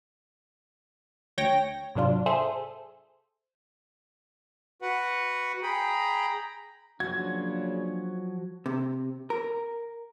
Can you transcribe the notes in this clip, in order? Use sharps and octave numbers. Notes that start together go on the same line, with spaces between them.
D2 C#5 G5 A#6
G#2 C3 F#3 D4 F4
G#4 A4 C5 E5
F#4 B4 F#5
G#4 G5 A#5 B5
C#3 F3 F#3 A#3 D4 F#4 G#6
C3
A#4